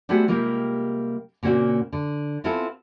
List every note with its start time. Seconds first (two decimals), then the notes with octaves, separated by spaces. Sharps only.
0.09 G3 A3 B3 C4 F#4 G#4
0.28 C3 G3 G#3 A#3 F4
1.43 A#2 C#3 A#3 C4 F#4
1.92 D3
2.44 B3 C4 E4 F4 G#4 A4